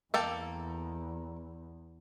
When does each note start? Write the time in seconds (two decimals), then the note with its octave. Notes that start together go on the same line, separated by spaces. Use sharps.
0.14 E2 A#3 A4 G5